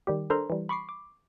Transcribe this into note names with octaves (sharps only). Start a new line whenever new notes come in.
D#3 G3 G4
D4 A4 A#4 C5 A#5 C6
E3 G3
B5 C#6 D6 C7
D6